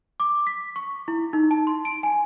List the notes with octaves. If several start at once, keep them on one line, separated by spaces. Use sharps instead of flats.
D6
B6
C#6
E4
D#4
A5
C6
D7
G#5